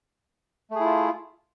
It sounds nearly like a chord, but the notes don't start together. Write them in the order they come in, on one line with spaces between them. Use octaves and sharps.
A3 G#4 E4 F4